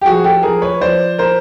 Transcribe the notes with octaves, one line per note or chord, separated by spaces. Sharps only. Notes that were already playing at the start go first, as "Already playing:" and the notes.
G4
F3 F#4 G#4
G4 A4
F3 G#4 A#4
B4 C#5
F3 C5 D5
A#4 C5